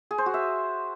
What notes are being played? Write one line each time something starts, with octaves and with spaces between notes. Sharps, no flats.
G#4
C5
F#4
E5